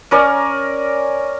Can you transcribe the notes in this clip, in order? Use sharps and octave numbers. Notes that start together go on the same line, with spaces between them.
C#4 A#4 C#5 D5